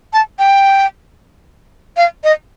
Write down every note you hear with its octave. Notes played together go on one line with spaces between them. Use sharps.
A5
G5
F5
D#5